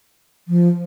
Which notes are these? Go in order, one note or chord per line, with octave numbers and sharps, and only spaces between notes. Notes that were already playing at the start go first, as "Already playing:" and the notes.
F3